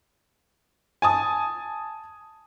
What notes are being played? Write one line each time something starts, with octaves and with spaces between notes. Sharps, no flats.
G#5 A5 D#6